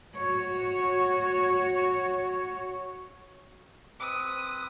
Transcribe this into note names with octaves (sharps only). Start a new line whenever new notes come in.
F#4 C#5
C4 B4 D#6